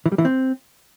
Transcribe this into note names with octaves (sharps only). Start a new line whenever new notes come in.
E3
G3
E3
C4